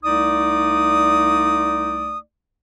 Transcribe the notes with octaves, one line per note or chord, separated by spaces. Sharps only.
C2 A3 D#4 D5 D#6